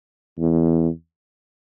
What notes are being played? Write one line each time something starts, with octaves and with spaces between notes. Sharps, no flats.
E2